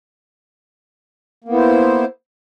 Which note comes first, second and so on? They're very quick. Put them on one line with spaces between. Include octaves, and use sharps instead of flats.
A#3 B3 E4 C5